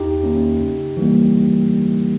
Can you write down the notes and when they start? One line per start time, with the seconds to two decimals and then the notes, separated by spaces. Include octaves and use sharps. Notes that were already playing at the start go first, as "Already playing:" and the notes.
Already playing: E2 D#4 G4
0.23 D#3 A#3 C#4
0.60 C#3
0.97 E3 G3 A#3